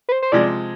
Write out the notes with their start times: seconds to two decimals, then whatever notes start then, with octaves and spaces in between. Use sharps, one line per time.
0.09 B4
0.12 C5
0.22 C5
0.32 C3 F3 G#3 D5